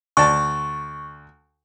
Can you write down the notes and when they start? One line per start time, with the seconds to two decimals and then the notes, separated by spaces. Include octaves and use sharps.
0.17 D2 D5 A5 C#6